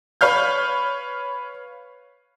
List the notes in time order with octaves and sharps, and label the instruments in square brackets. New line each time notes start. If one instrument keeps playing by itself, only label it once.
[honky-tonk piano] B4 C#5 F5 F6 G6